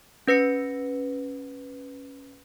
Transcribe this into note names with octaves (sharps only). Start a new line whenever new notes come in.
C#4 B4 A#6 C#7